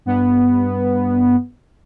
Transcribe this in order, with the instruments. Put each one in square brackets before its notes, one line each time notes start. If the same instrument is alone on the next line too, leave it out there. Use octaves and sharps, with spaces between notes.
[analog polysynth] G2 B3